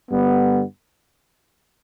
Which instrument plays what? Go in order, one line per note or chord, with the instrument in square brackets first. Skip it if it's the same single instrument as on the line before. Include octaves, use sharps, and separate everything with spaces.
[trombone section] G2 D3 G3 B3